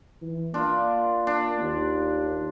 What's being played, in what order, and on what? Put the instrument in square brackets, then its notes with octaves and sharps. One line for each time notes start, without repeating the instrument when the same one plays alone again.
[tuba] E3
[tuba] A#3 [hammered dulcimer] D4 F4
[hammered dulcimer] D4
[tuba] D#2